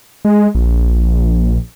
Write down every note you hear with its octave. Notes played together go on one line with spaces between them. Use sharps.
G#3
A#1